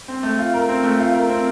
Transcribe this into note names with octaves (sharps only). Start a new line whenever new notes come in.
C4
A3
F4
A#4
C4
A3
F4
A#4
C4